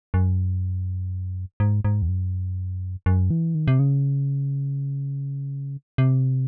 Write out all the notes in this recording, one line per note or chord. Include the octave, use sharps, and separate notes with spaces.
F#2
G#2
G#2
E2
F#2
F#2
E3
D#3
C3
C#3
C3